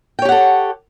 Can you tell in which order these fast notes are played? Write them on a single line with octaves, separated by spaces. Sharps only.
G5 C#5 G4 F#5 A4